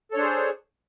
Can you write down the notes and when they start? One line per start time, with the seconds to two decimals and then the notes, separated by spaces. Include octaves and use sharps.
0.11 A4
0.14 C#5
0.17 D4
0.20 C5
0.22 G#4